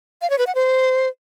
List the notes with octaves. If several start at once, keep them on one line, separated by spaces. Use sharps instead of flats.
F5
C#5
B4
F#5
C5